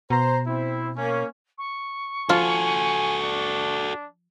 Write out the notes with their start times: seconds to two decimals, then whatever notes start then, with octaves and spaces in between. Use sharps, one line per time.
0.10 B2 C5 A#5
0.47 C4 E4
0.96 A#3 C#4
1.58 C#6
2.29 F3 F4 F#4 A4 G#5
3.24 D4